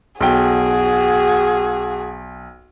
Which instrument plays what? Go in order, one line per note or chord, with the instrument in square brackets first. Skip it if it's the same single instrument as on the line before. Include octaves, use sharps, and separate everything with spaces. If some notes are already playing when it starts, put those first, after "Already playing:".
[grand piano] B1 G5 [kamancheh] F#4 G#4